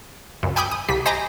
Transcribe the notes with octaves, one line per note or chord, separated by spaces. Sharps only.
C#2 F#2
G5 G#5 B5 D6 D#6 G6
D#6
C2 G3 B6
C5 D#5 G#5 A#5 B5 D6